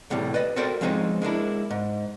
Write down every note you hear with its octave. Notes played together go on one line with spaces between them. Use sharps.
E2 A2 C3 G3
B4 D5 D#5
F#4 A4 A#4 C5 D5 G5
F3 G#3 C4 C#4 D#4 F4
G#3 A#3 D4 E4
G#2